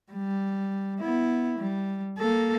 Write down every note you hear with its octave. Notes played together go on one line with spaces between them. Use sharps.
G3
B3 E4
G3
A#3 A4